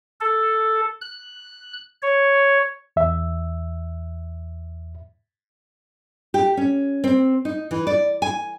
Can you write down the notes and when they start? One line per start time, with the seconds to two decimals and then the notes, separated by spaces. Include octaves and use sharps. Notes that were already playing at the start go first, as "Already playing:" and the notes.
0.21 A4
1.01 F#6
2.02 C#5
2.96 E2 E5
6.34 G4
6.57 C#4
7.04 C4
7.45 D#4
7.71 E3
7.87 D5
8.22 G#5